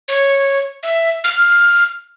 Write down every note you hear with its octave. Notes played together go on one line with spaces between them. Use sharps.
C#5
E5
F6